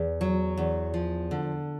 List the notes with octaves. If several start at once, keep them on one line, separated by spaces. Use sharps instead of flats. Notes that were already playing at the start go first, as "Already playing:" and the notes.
Already playing: E2
F#3
E2
F3
D3